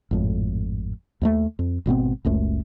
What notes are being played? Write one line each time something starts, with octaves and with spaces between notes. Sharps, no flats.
G#1 F2 A2
D#2 G#3 A3
F2
G#1 B2 B3 C4
F#1 C#2 F#2 A3